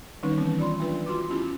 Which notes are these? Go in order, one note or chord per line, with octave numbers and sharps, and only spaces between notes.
D#3 G3 C4 C#4 D#4 B4
E3 B3 C4
F4 D5 B5 C6
F#3 A3 D4 F4 B4
F4 F#4 C6 D6
B3 C#4 E4 F4 G4